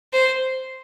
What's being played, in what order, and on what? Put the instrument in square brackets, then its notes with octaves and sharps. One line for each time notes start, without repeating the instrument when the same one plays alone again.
[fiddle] C5